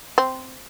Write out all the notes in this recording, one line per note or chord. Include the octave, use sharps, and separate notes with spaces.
C4